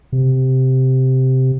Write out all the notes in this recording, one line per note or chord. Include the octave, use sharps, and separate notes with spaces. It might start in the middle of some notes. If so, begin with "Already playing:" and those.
C3